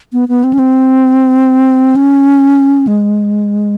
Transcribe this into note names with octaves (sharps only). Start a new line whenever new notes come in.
B3
B3
C4
C#4
C4
C#4
G#3